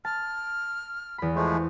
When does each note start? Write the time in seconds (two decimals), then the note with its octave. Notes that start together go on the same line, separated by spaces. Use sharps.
0.05 A5 F6
1.18 E2 B5
1.35 F3 G#3 A3